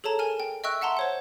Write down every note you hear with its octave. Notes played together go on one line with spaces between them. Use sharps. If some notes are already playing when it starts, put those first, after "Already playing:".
G#4 A4 C#5 A5 A#5
A#4 G#5 F6
G5
D#5 E5 G5 C#6 E6 F#6
E5 F#5 A5 A#5 C6
C5 C#5 F#5